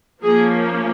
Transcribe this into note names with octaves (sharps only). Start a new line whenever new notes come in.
F3 A#3 C#4 G#4